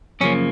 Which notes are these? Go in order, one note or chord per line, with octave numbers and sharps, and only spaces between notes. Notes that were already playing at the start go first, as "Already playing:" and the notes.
F#2 C#3 F3 A#3 C#4